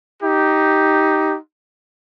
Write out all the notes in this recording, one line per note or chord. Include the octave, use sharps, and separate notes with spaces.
D#4 G4